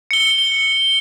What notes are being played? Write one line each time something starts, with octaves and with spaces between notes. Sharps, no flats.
C#7 G7
G7